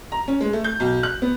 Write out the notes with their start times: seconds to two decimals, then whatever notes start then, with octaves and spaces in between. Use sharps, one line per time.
0.12 A#5
0.28 C#4
0.41 G#3
0.53 A3
0.64 G6
0.80 B1
1.03 F#6
1.22 B3